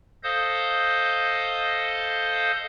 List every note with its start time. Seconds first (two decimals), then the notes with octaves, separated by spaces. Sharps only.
0.23 A4 C5 D#5 F5 D#6 G6